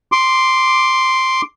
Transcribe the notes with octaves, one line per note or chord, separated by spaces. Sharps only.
C6 D6